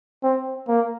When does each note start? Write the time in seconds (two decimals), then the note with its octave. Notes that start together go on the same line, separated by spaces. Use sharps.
0.23 C4
0.68 A#3